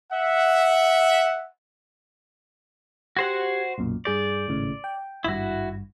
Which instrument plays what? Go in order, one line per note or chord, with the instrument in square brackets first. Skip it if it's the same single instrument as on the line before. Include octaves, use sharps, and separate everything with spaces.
[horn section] E5 F#5
[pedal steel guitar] F#4 C5 F#5 [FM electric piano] G4 G#6
[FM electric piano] B1 F#2 A#2
[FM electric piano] G2 G#4 G6 [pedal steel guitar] D5
[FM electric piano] G#1 A2 C#3
G5
[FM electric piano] G#1 G2 [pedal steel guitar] E4 F#4